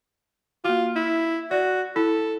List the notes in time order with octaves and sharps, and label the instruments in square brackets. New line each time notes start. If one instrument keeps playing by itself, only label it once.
[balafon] A#3 F#4 [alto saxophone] F4
[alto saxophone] E4
[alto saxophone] F#4 [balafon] D5
[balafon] E4 [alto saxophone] A4